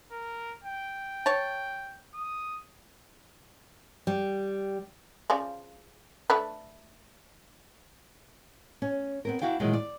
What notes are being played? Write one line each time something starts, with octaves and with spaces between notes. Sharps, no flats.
A#4
G5
C#5 A5
D#6
G3
C#3 F3 D5
A3 D4 B4
C#4
B3 C4 A#4
D4 E4 F#4 F5 G5
A#2 D#3 E3 F#3 G#3
D5